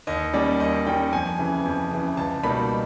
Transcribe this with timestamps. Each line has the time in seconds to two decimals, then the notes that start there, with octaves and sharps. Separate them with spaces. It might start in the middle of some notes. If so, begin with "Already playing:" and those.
0.07 D#2 D#5
0.33 D#3 G3 A#3 C#4 D5
0.60 D#2 D#5
0.86 D#3 G3 A#3 C#4 G5
1.13 F2 G#5
1.39 C#3 E3
1.65 F2
1.91 C#3 E3
2.17 C#2 A5
2.43 B2 G3 A#3 D#4 B5